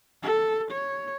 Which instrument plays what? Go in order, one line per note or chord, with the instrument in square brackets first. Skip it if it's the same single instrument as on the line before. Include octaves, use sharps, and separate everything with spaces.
[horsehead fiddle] A4
C#5